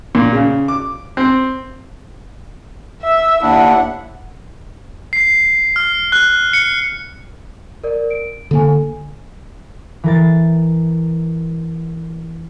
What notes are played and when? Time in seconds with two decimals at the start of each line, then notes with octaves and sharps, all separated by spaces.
0.15 A#2
0.33 C#3
0.68 D6
1.17 C4
3.03 E5 E6
3.42 D#2 D4 E4 F#5
5.13 C7
5.76 F6
6.12 F#6
6.53 C#7
7.84 A#4 D5
8.11 D7
8.51 D3 A#3 A4 G#5
10.04 E3 A#4 A6